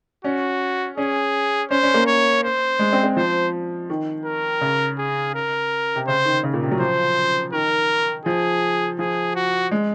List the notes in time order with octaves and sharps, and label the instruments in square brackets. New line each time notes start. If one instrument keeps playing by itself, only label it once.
[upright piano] C#4 [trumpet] F#4
[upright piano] C#4 [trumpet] G#4
[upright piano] C#4 [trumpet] C5
[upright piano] C#4
A#3
[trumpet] C#5
C5
[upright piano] G#3
C4
C4
[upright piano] F3 [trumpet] C5
[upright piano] D#3
[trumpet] A#4
[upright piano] C#3
[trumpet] G#4
A#4
[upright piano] C3
[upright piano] C#3 [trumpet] C5
[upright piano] D#3
C#3
A#2
C3
F#3
[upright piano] F3 [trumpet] C5
[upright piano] D#3 [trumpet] A#4
[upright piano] F3 [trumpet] G#4
[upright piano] F3 [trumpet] G#4
[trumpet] F#4
[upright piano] G#3